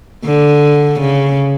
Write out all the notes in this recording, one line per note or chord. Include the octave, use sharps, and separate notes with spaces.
D3
C#3